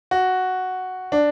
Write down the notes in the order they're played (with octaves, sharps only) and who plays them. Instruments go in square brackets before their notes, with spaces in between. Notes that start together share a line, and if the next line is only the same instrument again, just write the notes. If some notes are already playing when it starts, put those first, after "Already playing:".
[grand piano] F#4
D4